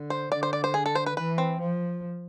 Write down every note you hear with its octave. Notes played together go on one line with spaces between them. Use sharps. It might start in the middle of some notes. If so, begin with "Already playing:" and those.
Already playing: D3
C5
D3 D5
C5
D5
C5
G#4
A4
C5
B4
E3 B4
C4
F3